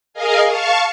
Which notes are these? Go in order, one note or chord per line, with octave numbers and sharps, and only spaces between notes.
G#4 A#4 D#5 F5 G#5
F5 A5 C#6